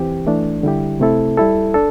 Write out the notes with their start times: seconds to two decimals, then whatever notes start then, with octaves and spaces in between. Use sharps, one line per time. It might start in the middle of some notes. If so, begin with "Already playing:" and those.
Already playing: E3 C4 G4
0.27 E3 A3 D4
0.63 D3 G3 E4 G4
1.00 C3 A3 C4 E4 A4
1.37 G3 E4 A4
1.74 D4 A4